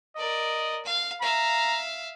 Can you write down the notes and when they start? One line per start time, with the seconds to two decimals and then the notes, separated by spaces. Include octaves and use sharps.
0.17 A#4 D5 D#5
0.85 F5
1.22 E5 F5 A#5